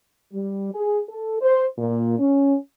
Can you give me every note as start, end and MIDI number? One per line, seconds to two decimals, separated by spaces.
0.33 0.70 55
0.73 0.98 68
1.09 1.38 69
1.41 1.65 72
1.78 2.17 46
2.19 2.56 61